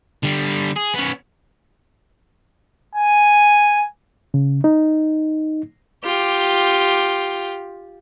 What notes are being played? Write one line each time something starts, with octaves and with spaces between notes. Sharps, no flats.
D3 G3
G#4
B3 C#4
G#5
C#3
D#4
F4 G4